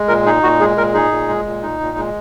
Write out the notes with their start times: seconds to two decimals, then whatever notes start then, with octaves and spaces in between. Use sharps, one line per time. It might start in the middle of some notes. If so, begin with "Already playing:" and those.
Already playing: G#3
0.08 A#2 A#4
0.25 D#4 G#4
0.43 A#2 F#4
0.59 G#3 G#4
0.77 A#2 A#4
0.94 D#4 G#4
1.11 A#2
1.28 G#3
1.46 A#2
1.63 D#4
1.81 A#2
1.97 G#3